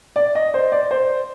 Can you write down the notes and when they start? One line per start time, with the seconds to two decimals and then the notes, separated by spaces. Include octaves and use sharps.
0.16 D5
0.35 D#5
0.54 C5
0.72 D5
0.91 C5